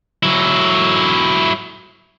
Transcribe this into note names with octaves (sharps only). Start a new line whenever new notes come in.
F#3 E4